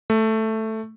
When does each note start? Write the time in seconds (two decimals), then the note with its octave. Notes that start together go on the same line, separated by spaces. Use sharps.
0.10 A3